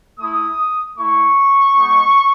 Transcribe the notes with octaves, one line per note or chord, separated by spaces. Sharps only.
A3 E4 D#6
A3 E4 C#6
G#3 B3 D#4